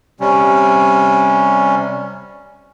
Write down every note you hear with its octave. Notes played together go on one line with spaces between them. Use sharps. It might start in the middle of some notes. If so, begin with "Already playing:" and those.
C3 G3 C#4